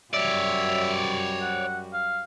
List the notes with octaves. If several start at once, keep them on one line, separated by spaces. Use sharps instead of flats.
F#2 G3 F#4 C#5 D5 E5
F#5
F5